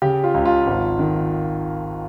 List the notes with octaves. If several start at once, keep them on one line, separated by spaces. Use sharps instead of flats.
C#3 G4
F4
C#2
F4
G#1
D#3